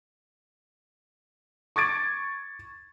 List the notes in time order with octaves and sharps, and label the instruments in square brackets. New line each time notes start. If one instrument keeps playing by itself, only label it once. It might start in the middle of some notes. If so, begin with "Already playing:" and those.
[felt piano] C#6 D6 G#6 A6 D7